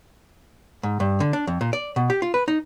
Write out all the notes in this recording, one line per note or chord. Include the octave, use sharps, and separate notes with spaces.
G#2
G2
D3
D4
F2
A#2
D5
B2
G4
F4
B4
D#4